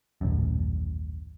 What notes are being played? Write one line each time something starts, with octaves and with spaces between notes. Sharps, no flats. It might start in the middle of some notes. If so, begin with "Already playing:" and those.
D#1 A1 F#2